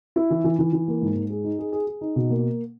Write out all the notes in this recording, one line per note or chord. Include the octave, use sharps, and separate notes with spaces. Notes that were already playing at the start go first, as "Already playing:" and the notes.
E4
E3
E3
E3
E3
A#3
G#2
G#2
G#4
D#4
G#4
G#4
G#4
D#4
B2
A#3